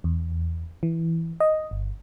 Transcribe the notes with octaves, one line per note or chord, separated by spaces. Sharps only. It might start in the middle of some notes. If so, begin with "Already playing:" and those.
E2
E3
D#5
G1